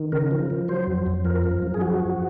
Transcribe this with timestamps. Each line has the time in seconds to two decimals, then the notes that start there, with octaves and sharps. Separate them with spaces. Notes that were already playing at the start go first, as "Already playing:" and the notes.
Already playing: D#3
0.12 C#3 A#4
0.31 F3
0.50 F3
0.68 F#3 C5
0.87 F2
1.06 F2
1.25 F3 A#4
1.44 F#2
1.62 F#2
1.74 G#4
1.81 F3 F#4
2.00 F3